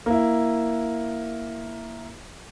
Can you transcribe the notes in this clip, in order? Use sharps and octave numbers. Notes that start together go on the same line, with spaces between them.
A#3 E4